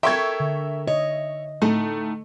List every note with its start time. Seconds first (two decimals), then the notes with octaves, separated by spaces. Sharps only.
0.03 A4 A#4 E5 G5 C#6 G#6
0.40 D3
0.88 C#5 D#5
1.62 A2 A3 D#4